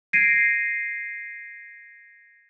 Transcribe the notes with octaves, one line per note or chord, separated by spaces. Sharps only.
G#6 A#6 C7 D7 D#7